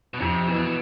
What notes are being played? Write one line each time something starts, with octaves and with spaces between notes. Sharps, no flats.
B2
F2 C3
B2 E3